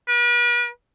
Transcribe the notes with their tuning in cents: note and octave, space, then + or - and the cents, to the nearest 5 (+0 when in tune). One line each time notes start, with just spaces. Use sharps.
B4 -45